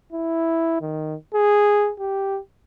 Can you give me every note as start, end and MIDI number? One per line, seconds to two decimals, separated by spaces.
0.13 0.80 64
0.81 1.15 51
1.34 1.91 68
2.00 2.39 67